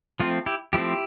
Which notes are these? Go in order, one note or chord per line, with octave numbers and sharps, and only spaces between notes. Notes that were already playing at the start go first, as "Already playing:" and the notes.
F3 A3 C4 F4
E4 G4
F3 A3 C4 E4 G4